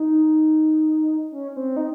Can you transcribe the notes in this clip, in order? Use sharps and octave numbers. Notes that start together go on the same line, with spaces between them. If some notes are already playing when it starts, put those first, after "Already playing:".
Already playing: D#4
C#4
C#4
C4
D#4